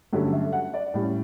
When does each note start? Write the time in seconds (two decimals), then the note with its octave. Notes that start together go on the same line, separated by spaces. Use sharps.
0.13 G2 D3 F#3 A3 C#4 G4
0.33 E5
0.53 F#5
0.74 D5
0.94 A2 G3 C#4